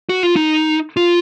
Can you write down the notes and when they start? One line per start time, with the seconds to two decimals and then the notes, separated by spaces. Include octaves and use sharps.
0.09 F#4
0.23 F4
0.36 D#4
0.97 F4